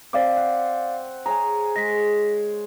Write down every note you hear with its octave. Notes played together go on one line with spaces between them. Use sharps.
C4 D5 F5 D6
F#5
G#4 C#5 G#5 A#5
G#3 A#6 B6